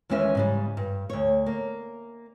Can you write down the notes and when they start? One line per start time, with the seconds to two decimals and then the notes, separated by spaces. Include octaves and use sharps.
0.10 D#2 E3 G#3 C#4 C#5 E5
0.35 G#2 C#3 G3
0.77 G2
1.10 D2 C#5
1.46 A#3